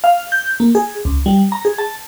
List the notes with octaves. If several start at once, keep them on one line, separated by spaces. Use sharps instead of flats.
F5
G6
A#3
G#4
C#2
G3
A#5
G#4
A5